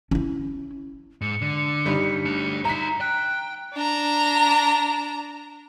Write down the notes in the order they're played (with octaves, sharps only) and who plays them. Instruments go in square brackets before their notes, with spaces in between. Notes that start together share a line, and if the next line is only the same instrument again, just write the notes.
[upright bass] C#4 E4
[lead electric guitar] G#2 [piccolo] C#7
[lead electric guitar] D3
[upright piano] G1 G3 D#4
[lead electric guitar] A3 D4
[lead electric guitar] D#4 E5 [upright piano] A#5 B6
[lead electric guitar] G5 [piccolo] F#6
[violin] D4 A#5